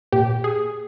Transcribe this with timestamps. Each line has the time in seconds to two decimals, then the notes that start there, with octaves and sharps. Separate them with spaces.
0.12 A#2 G4
0.44 G#4